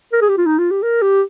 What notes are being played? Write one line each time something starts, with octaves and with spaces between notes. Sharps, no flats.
A#4
G#4
G4
F4
D#4
F4
G4
A#4
G4